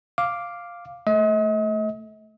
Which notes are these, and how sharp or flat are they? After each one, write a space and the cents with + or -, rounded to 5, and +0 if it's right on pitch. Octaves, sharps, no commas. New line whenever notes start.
F5 +0 D6 +0
A3 +0 D#5 +40